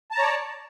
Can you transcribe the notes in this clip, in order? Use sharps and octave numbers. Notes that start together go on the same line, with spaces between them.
C#5 D5 A5 A#5